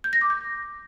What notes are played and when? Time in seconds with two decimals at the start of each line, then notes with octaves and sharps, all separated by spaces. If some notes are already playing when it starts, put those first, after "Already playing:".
0.04 G6
0.13 A#6
0.21 D6
0.30 G6